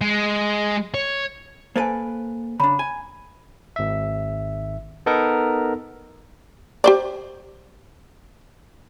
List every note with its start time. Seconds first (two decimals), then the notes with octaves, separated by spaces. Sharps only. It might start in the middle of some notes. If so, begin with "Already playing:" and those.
0.01 G#3
0.94 C#5
1.76 A#3 A4 B4 C5 G#5
2.60 C#3 D4 A#5 B5
2.79 G#5
3.76 G#1 E5
5.06 B3 D#4 A4 A#4
6.84 G4 C5 D5